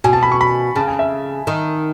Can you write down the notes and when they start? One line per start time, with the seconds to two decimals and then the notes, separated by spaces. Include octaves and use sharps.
0.04 B2 G#5
0.13 A5
0.23 B5
0.32 C#6
0.41 B5
0.75 C#3 A5
0.88 G#5
0.99 E5
1.47 D#3